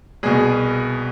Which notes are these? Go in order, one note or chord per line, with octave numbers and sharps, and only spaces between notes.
C2 B2 G#4